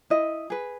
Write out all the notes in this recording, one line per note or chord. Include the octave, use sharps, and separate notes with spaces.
E4 D#5
G#4 B4